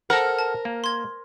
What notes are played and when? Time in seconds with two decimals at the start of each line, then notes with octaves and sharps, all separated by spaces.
0.10 A4 A#4 C5 F#5 A#6
0.39 A5
0.65 A#3
0.84 C6 G#6